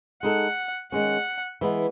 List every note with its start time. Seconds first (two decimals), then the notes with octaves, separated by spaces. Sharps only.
0.23 G#3 D#4 A4 F#5
0.92 D#3 G#3 C#4 F#5
1.61 E3 G#3 B3